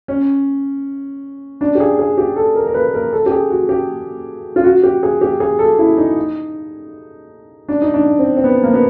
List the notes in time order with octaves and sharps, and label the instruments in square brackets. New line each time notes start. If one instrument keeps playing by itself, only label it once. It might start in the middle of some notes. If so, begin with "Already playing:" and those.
[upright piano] C#4
D4
G4
G#4
G#4
G4
A4
A#4
A#4
B4
A#4
A4
G4
G#4
F#4
G4
F4
F#4
G4
G#4
G4
G#4
A4
E4
D#4
D4
D#4
D4
C4
C4
B3
A#3
B3